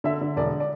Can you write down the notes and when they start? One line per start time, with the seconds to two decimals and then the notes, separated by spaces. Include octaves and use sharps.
0.04 D3 E5
0.21 D3
0.37 E1 D5
0.60 D5